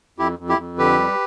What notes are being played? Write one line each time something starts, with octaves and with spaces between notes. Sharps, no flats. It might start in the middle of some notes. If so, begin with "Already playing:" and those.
F2 E4 G4
F2
E4 G4
F2
D3 G4 B4
G3